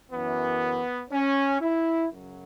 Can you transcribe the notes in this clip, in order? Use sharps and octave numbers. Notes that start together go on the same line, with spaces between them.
F#2 E3 B3
C#4
E4
F#2 C#3 F#3